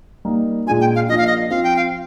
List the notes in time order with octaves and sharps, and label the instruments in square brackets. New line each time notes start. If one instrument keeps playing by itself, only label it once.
[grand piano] G3 A#3 D#4
[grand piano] A#2 G#3 D4 F4 [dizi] G#5
[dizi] G5
F5
[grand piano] F3 A#3 D4 F4 [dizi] D#5
[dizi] F5
D#5
[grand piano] F3 C4 F4 [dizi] F5
[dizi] G5
F5